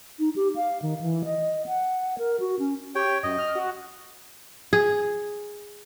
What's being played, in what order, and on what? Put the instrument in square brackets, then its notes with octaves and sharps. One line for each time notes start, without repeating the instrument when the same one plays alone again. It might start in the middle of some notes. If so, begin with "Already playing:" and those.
[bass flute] D#4
G4
F5
D#3
E3
D#5
F#5
A#4
F#4
C#4
[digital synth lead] G4 [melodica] C#5 G5
[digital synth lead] F#2 [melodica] D#5
[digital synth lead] F6
F#4
[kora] G#4